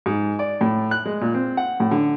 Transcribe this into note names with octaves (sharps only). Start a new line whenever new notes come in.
G#2
D5
A2
F#6
G#3
A#2
C4
F#5
A2
D3